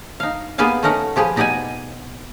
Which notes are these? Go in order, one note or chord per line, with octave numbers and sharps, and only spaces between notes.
D#4 F5
A#3 B3 G4 G#4 F5 G#5
A3 C#4 D#4 A#4 F#5
F3 G4 G#4 B4
B2 D#4 G4 D5 F#5 G#5